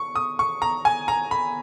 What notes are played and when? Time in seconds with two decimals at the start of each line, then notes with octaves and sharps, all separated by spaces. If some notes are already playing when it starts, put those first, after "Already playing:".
Already playing: C#6
0.16 D#6
0.39 C#6
0.62 A#5
0.85 G#5
1.08 A#5
1.31 B5